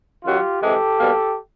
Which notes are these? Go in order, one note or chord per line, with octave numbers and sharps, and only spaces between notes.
F#2 D#3 F#3 F4 G4
C3 E3 G#3 G4 A4
B2 G3 A#3